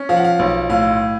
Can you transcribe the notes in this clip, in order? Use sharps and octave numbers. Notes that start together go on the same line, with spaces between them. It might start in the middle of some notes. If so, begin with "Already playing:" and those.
Already playing: C#4
F3 F5
F#5
F5
B1
A2 F5